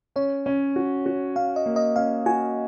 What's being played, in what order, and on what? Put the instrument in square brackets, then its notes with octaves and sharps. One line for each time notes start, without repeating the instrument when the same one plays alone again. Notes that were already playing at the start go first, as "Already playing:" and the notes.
[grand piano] C#4 [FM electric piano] C#5
[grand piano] C#4
F#4
F#4
[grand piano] C#4 [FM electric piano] F5
[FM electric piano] D#5
[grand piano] A#3
[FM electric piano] D#5
[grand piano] C#4 [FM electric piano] F5
[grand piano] F#4 [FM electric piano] G#5